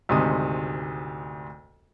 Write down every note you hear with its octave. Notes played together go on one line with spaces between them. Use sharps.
D2 G#2 C3 D#3 D#6